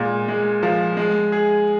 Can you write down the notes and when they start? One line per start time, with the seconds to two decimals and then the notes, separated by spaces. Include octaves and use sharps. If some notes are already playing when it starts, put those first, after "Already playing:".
Already playing: A#2 G#3
0.28 G#3
0.63 F3
0.97 G#3
1.32 G#4